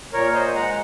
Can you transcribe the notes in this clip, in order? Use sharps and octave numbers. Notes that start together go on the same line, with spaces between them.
A#2 A#4 C#5
C5 D#5
G#3 F#5 A#5